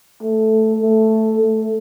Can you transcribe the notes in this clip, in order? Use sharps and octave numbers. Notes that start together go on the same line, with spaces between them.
A3
A3
A3